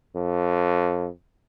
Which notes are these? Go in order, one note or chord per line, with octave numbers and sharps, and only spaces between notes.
F2